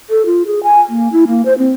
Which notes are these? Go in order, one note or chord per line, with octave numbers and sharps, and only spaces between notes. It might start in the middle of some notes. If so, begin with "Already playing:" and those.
A4
F4
G#4
G#5
A#3
E4
A#3
C5
C4